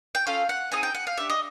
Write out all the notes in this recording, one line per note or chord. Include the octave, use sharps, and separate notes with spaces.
G5
C#4 F4 A4 F5
F#5
C4 D#4 G#4 G#5
G5
F#5
F5
D4 G4 E5
D#5